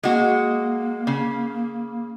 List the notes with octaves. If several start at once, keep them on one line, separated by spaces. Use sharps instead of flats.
G#3 A#3 F#4
C#3